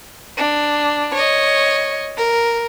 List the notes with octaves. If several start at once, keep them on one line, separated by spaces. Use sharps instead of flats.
D4
C#5 D#5
A#4